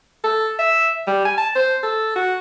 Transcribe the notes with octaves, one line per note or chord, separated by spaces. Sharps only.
A4
E5
G3
G#5
A5
C5
A4
F#4